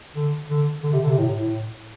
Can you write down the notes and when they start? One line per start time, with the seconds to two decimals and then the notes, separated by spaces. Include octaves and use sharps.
0.16 D3
0.50 D3
0.84 D3
0.93 C3
1.01 D3
1.09 C3
1.18 A2
1.36 A2